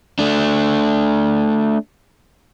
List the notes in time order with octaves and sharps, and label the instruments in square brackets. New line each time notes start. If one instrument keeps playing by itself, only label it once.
[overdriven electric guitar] A3 D4